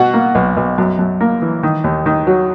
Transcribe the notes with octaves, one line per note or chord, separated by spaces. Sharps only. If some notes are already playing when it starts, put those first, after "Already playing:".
Already playing: B2 F#4
A#3
B1
B1
F#2
F#2
A#3
E3
D#3
D#2
D#3
F#3